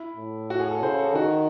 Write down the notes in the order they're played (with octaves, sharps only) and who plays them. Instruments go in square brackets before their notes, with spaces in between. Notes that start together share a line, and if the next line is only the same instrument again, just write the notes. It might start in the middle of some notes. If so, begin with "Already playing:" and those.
Already playing: [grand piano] E4
[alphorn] A2
[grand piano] F#4
G#4
A4
[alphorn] C#3 [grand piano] C5
[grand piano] A4
[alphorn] D#3 [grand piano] F#4